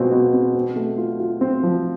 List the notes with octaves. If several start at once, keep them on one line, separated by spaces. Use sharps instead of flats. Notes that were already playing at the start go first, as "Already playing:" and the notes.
Already playing: B2 G#3 C4 F4
B2
C4
C4
A3
F4
F4
C4
F3